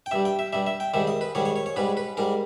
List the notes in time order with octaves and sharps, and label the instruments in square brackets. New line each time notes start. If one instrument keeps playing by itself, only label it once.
[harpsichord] G5
G2 G3 E5
G5
E5
G2 G3 E5
E5
G5
G#2 D#3 G3 E5
D#5
B4
G#2 D#3 G3 C#5
C#5
C#5
C#5
G#2 G3 B4
B4
G#2 G3 A#4